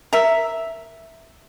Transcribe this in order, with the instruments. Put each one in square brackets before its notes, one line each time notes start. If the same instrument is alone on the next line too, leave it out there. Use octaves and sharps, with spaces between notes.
[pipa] A#4 E5